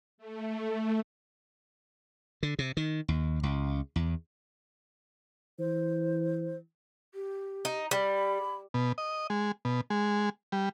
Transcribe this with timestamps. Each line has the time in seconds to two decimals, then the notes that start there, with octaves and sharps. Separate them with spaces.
0.18 A3
2.43 D3
2.59 C3
2.77 D#3
3.08 D#2
3.43 C#2
3.96 E2
5.59 E3 C5
7.14 G4
7.65 D#4
7.91 G3 B5
8.74 B2
8.98 D#5
9.30 G#3
9.65 B2
9.90 G#3
10.52 G3